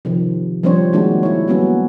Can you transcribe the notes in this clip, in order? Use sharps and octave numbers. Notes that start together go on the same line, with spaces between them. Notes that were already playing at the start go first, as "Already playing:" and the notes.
C3 D#3 F3
F3 G3 C4 D4 C5 C#5
D#3 G#3 A#3 D4 F#4
E4 C#5
F#3 G3 A#3 B3 C#4 F#4